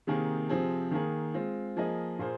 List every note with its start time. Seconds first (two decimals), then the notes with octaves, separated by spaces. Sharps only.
0.07 C3 D#3 A#3 G#4
0.49 C3 F3 C4 G#4
0.91 D#3 A#3 G#4
1.34 G#3 C4 F4
1.77 F3 A#3 G#4 D#5
2.19 A#2 A#3 F4 G#4 C5